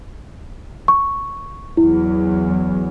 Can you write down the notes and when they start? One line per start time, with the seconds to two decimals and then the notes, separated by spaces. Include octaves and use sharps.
0.88 C#6
1.77 E2 F#3 E4